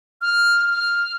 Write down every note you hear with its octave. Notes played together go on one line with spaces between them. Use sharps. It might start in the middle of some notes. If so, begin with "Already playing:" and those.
F6
F6